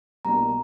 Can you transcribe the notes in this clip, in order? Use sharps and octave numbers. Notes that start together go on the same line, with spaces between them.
C2 B2 G3 A#3 D4 A#5